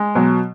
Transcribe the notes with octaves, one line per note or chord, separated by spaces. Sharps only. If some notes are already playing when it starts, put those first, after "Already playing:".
Already playing: G#3
B2 F#3